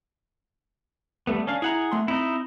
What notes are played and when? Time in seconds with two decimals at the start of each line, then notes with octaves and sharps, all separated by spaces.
1.27 G3 A3 B3
1.47 C#4 D4 F5
1.62 E4 G#4 F#5 A#5
1.91 A3 C6
2.08 C4 D#4 E4